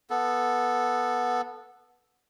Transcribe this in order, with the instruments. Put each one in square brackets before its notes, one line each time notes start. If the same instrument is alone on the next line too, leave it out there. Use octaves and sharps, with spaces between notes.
[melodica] B3 A4